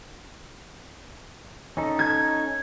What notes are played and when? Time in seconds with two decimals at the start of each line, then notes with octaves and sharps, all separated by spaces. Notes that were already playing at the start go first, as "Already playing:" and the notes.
1.77 C#4 D#4 A4
1.99 G#6